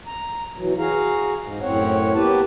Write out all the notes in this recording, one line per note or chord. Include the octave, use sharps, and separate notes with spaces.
A#5
B2 E3 F#3
F#4 G#4 F5 A#5
G#2
F#2 A2 C4 C#5 F#5
A#3 B3 G4 B4 A5